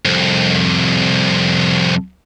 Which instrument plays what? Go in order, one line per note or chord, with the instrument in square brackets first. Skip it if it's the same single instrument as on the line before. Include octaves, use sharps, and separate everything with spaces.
[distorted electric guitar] C2 F2